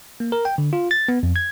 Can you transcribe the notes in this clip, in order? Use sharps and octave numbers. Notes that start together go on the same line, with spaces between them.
A#3
A#4
G5
D3
F4
A6
B3
F2
G#6